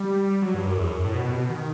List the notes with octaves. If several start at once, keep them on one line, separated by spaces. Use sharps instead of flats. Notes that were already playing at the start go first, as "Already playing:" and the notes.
Already playing: G3
F#3
G2
F#2
E2
F#2
A2
B2
B2
C3
B2
D#3